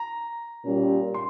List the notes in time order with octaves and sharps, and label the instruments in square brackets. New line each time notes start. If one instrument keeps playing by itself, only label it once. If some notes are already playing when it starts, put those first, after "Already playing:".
Already playing: [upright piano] A#5
[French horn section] A#2 G3 C#4 G4
[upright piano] C6